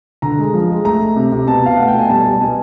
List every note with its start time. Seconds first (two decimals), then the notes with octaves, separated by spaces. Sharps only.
0.22 D3 A#5
0.38 G#3
0.54 F3
0.70 G#3
0.84 A3 A#5
1.01 A3
1.16 C3
1.32 C3
1.47 B2 A5
1.62 B2 F5
1.77 A3 F#5
1.88 G5
1.94 B2 G#5
2.09 G3 A5
2.24 G3
2.41 B2 G#5